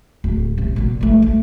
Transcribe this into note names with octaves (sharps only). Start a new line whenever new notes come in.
D1 D3
C2
A#2 F#3
F3 A3
A3